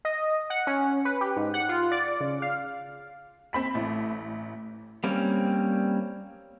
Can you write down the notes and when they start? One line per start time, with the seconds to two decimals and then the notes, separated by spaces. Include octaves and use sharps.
0.05 D#5
0.50 F#5
0.67 C#4
1.05 B4
1.21 G4
1.36 G#2
1.54 F#5
1.69 F4
1.91 D5
2.21 C#3
2.42 F5
3.53 C4 B5 B6
3.75 A1 A3
5.04 G3 A#3 C4 C#4